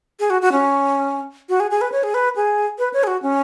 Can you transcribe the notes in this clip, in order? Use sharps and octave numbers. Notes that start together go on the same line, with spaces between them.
G#4
F#4
F#4
C#4
F#4
G#4
G#4
B4
C#5
G#4
B4
G#4
B4
C#5
G#4
F#4
C#4